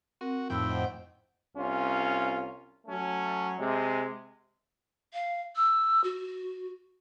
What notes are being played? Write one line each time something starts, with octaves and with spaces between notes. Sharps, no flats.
C4 F#4 A#4
F2 A2 D#4 G5 B5 E6
C5 D#5 F#5
C2 C#4 F4
F#3 A3 C#4
C3 G#3
F5
E6
F#4